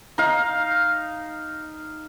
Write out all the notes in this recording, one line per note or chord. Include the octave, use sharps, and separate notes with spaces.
D#4 F5